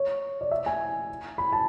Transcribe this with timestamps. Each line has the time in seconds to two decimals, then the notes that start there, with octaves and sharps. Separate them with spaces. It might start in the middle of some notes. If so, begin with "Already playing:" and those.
Already playing: C#5
0.41 D5
0.51 E5
0.66 G#5
1.38 B5
1.53 A5